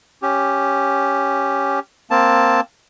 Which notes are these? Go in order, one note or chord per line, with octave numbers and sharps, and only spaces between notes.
C#4 G4
A#3 C4 A5